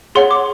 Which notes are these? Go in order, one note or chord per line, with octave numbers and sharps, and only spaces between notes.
G#4 C#5 F#5 C6
D6